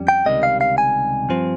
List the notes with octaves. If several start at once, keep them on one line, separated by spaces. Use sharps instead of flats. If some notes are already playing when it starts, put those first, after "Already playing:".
Already playing: F2 G3 C#4
G5
C#2 C3 D#3 G3 D#5
F5
F5
G#5
G2 F3 C4